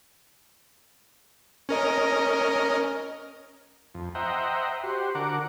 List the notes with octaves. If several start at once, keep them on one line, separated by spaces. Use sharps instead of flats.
C#4 A#4 D#5
F2
C5 D#5 E5 F#5 G5 A#5
F#4 G4 C5
D3 F#4 A#4 F#5 D6